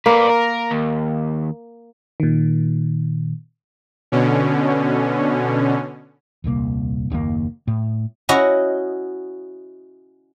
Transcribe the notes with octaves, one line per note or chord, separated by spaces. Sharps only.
A#3 B4 D5
A#4
D#2
A#2 D#3
B2 D3 C#4
D#1 C2 C#3 A#3
F#1 D#2 C#3 A#3
A2
C#4 E4 F#4 D#5